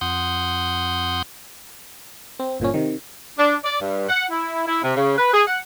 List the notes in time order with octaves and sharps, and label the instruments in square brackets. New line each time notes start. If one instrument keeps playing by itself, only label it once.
[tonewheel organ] F2 F#5 C6 D#6 G6
[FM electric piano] C4
G1 A#2 F3 C#4
C3 D#3
[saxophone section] D4
D5
G2
F#5
E4
E4
C3
C#3
B4
G#4
F#5